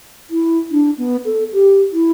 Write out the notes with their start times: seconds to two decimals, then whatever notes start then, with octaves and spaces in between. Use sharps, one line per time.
0.30 E4
0.72 D4
0.98 B3
1.25 A4
1.53 G4
1.93 E4